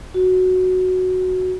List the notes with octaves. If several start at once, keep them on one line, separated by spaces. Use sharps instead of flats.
F#4